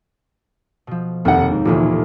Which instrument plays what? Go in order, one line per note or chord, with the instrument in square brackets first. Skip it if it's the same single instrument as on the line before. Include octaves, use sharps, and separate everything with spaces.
[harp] B2 F3
[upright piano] F1 F#5 [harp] D#2
[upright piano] G#2
[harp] F1 D2 E3 [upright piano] A#2